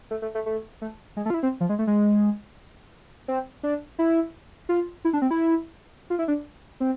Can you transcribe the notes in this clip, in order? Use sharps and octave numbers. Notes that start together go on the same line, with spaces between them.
A3
A3
A3
A3
A3
G#3
A3
F4
E4
C4
F3
G#3
A3
G#3
C4
D4
E4
F4
E4
D4
C4
E4
F4
E4
D4
C4